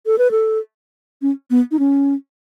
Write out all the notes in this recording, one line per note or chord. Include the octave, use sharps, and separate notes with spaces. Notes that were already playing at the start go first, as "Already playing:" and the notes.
A4
B4
A4
C#4
B3
D#4
C#4